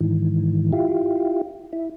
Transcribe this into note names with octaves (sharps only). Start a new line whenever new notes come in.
G#2 D#3 E3
E4 F4 G4
E4